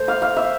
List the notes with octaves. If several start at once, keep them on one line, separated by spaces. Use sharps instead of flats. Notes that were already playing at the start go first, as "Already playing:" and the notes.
Already playing: A3 C5
F5
F5
E5